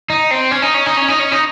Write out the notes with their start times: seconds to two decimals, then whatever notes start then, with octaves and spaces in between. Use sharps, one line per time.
0.10 D#4
0.31 C4
0.51 C#4
0.62 D#4
0.74 C#4
0.86 D#4
0.97 C#4
1.08 D#4
1.19 C#4
1.32 D#4